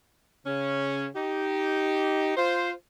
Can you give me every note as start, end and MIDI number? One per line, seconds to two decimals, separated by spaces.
0.47 1.08 49
0.47 1.08 61
1.15 2.36 63
1.15 2.36 67
2.37 2.72 65
2.37 2.72 72